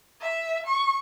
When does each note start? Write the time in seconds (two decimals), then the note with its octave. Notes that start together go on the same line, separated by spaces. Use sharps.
0.21 E5
0.67 C#6